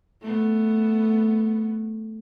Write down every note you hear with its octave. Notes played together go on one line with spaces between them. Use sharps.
A3 B3